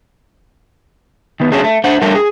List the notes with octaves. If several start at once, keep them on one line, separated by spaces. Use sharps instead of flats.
D#3 B3
F#3 A3 C#4 D4 G#4
A3
A3 D4 C5 F#5
G3 A3 D4 G4 A4 A#4
G#4